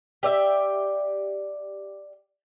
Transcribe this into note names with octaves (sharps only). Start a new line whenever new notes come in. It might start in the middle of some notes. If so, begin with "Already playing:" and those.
G4 D5 E5